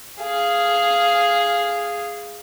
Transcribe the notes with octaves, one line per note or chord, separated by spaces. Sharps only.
G#4 F5